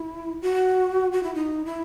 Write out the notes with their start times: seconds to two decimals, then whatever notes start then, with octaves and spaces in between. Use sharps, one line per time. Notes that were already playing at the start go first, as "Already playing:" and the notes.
Already playing: E4
0.42 F#4
1.12 F#4
1.23 E4
1.35 D#4
1.66 E4